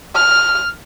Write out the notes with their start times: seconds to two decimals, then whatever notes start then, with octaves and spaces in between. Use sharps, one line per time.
0.16 F6